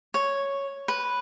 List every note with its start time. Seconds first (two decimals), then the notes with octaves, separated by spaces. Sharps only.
0.14 C#5
0.88 B4